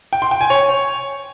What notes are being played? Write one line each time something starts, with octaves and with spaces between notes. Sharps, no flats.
G5
C6
G5
G#5
C#5